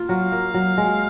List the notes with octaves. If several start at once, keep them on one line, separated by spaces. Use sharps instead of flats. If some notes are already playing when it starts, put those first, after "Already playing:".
Already playing: A#3 F4
F#3 F5
A#3
F#3
G#3